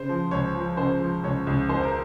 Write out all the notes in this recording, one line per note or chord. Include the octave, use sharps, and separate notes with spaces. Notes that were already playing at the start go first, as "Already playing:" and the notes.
Already playing: C#3 C5
F3
C#2 C#5
F3
C#3 C5
F3
C#2 C#5
C#2
E1 C5
A#4